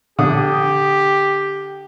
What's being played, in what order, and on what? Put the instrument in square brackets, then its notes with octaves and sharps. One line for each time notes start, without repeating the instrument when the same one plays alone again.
[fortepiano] D3 D#6 [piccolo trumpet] G4